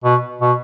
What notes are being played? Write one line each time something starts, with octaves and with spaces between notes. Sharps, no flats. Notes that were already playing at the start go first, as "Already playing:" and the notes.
B2
B2